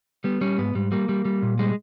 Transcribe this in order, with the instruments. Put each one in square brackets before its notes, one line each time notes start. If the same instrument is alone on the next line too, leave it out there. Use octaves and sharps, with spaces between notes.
[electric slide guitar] G3 B3
G3 C#4
G#2 B3
G#2 G3
G3 A#3
G3
G3
A#2
G3 G#3